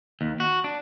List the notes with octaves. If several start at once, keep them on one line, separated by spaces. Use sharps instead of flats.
D#2
F#4
D4